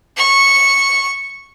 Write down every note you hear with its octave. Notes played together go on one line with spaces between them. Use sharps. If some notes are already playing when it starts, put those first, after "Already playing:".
C#6